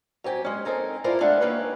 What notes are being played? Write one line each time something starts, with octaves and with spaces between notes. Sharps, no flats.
F#3 C4 G4 G#5
G#3 C#4
C4 D#4 A4 A#4 G#5
E4 F4 A4 A#4 C5 D5
G#3 A3 D4 A4 F5 F#5
D#3 A#3 C#4 G4 B4